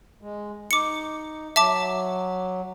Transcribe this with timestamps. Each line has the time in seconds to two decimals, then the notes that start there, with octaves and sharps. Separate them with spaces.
0.22 G#3
0.71 D#4 D6 C#7
1.56 F#3 E5 A5 D6